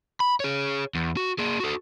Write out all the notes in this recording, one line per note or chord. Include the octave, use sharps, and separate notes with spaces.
B5
G#4 C#5
E2
F#4
A#3 G#4
F#4 A4